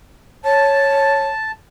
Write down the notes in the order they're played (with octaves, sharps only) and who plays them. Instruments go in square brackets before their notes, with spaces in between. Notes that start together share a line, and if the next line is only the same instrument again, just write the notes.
[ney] C#5 [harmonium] A5